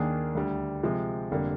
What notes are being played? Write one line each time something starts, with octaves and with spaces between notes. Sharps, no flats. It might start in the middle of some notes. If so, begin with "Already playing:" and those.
Already playing: D#2 D#3 A#3 D4 G#4
D2 D3 G3
C3 F3 G#3
F1 D3 G3 A#3